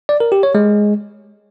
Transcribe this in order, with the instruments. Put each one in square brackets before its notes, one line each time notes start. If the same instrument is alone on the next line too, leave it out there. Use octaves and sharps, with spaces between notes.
[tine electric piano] D5
A#4
G4
C#5
G#3